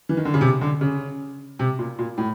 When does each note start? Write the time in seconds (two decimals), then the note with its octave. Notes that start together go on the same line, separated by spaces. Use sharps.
0.09 E3
0.17 D#3
0.25 D3
0.34 C#3
0.41 C3
0.61 D3
0.81 C#3
1.59 C3
1.79 A#2
1.99 A#2
2.18 A2